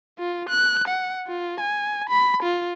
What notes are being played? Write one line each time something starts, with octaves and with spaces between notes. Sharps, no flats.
F4
F#6
F#5
F4
G#5
B5
F4